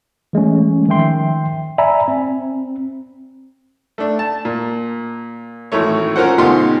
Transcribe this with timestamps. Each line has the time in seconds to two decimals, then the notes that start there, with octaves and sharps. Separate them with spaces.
0.33 E3 G#3 A3 C#4
0.88 D#3 F3 E5 G5 C6
1.78 D5 E5 G#5 A#5 B5
2.08 C4
3.98 A3 D4
4.19 A5
4.45 A#2
5.72 G#1 A2 E3 A3 C#5
6.16 C#4 F4 A#4 C5 F#5
6.38 G#2 B2 D3 F4 G4 C6